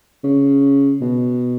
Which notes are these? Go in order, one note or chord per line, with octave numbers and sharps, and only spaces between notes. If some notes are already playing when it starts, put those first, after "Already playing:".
C#3
B2